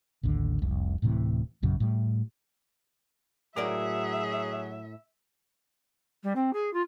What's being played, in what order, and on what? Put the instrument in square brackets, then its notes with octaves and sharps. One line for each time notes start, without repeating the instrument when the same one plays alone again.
[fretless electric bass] A1 D#2 D3
F1 C2
D1 A2 C3 E3
A#1 F#2 C#3
A2 G3
[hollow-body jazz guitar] A2 A#4 D5 [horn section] F#3 [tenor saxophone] G#4 [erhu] E5
[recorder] G3
C4
G#4
F4